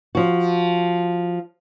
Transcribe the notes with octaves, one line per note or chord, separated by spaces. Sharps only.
F3 F#4